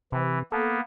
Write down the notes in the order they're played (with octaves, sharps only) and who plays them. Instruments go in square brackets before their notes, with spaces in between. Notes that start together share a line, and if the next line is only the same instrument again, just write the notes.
[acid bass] C3 [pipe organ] E3
[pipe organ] A#3 B3 [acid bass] A4